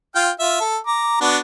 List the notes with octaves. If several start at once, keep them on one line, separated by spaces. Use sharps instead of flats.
F4 F5 G5
F4 E5
A4
A#5 D6
B3 D4 F#4